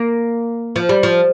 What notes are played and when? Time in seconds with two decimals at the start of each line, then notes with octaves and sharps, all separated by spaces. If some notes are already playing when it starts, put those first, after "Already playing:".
Already playing: A#3
0.76 F3
0.89 G3
1.03 F3